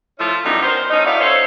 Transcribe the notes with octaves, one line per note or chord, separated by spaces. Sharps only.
F3 A3 C#4 E4 F4
F#2 E3 G3 B3 D#4
B3 A#4 C5
A3 C#4 D#4
B3 E4 F#4 D5 F5
C#4 D#4 A4 C5 C#5